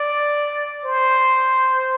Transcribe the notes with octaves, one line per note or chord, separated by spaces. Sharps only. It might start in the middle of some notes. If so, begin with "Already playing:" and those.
Already playing: D5
C5